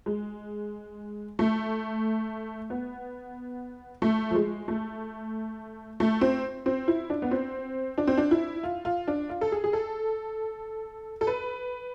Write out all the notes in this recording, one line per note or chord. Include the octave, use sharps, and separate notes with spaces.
G#3
A3
B3
A3
F3
G#3
A3
A3
C4
C4
E4
D4
B3
C4
D4
C4
D4
E4
F4
F4
D4
F4
A4
G#4
G#4
A4
A4
B4